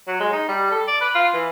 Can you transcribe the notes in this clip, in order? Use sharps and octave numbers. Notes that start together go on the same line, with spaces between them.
F#3
G#3
D#4
G3
A4
D5
B4
F4
E3